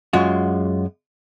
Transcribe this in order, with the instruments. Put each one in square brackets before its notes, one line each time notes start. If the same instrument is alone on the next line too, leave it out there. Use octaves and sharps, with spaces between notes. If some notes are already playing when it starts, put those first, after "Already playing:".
[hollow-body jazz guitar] F#2 G#3 F4 F#4